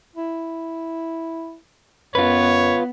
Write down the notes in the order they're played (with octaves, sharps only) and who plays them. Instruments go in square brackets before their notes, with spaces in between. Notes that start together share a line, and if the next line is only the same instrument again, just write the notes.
[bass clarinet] E4
[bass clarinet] F#2 [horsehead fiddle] B3 [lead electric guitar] F4 B4 [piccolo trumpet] C#5